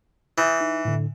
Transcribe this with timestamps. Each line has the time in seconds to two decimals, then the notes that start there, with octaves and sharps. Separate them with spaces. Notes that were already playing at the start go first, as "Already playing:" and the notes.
0.38 E3 D#6 G6 A6
0.61 D#4
0.85 A2 D3